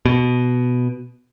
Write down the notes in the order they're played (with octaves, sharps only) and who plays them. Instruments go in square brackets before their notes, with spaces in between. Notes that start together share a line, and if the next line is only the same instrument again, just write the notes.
[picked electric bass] B2